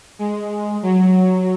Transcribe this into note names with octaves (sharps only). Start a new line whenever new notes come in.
G#3
F#3